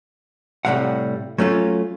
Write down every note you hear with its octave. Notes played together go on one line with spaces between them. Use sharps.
A2 C3 G3 A3 F5 F#5
F#3 A3 C#4 F4